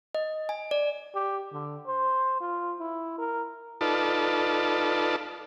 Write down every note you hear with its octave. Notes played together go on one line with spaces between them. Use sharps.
D#5
G#5
D5
G4
D3
C5
F4
E4
A#4
D#4 F4 A4 B4 D5 A5